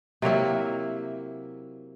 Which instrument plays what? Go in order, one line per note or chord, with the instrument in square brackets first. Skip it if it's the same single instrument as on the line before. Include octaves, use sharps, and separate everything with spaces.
[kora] C3 F#3 A#3 E4